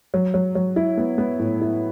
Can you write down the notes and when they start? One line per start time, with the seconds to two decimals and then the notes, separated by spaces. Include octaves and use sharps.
0.14 F#3
0.34 F#3
0.55 F#3
0.76 E4
0.97 B3
1.18 B3
1.39 A2
1.61 E4